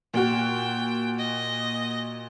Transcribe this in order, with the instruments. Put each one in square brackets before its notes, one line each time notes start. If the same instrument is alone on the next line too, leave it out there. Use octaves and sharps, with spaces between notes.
[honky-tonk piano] A#2 F#4 [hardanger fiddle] G5
[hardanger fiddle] D#5